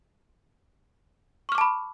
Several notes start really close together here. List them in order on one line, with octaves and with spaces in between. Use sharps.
C#6 F6 D6 A5 B5